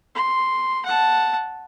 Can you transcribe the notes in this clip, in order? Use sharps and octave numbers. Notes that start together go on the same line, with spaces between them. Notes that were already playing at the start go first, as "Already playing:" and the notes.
C6
F#5 A5